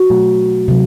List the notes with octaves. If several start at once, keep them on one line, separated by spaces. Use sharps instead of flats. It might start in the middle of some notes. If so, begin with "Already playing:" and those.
Already playing: F#4
B2 F#3 A3
C3 F#3